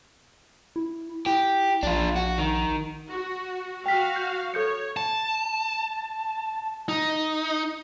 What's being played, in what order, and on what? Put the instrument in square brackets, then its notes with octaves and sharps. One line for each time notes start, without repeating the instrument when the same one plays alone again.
[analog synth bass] E4
[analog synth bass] E4 [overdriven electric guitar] G4
[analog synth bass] A#1 [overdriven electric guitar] D4 F4
[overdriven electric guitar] F#4
D#3
[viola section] F#4
[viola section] F#4 F5 [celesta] G5 B6
[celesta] G6
[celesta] A4 G6 C#7 [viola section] C#5
[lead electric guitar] A5
D#4